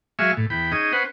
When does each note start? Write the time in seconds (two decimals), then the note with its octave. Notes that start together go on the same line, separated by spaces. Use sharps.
0.19 F#3 G#3 E5 F5 G#5 C#6
0.37 A2
0.50 E2 G5 B5
0.72 C#4 D#4 G#4 D#5
0.93 C#4 B4 C5 F#5